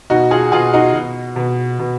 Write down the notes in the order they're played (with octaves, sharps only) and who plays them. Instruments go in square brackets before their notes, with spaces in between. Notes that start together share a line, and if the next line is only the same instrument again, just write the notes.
[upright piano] B2 D#4 F#4
F4 G#4
B2 F4 G#4
D#4 F#4
B2
B2
B2